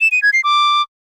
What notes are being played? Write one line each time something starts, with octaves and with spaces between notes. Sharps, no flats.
E7
D#7
G#6
C7
D6